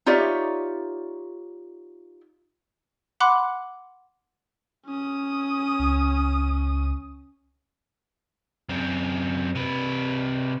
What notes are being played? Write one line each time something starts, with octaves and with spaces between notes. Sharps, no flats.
D#4 F4 G4 C#5 D5 E5
F#5 B5 C6 D6 F#6
C#4 D#6
C#2
F#2 C4
C3 B4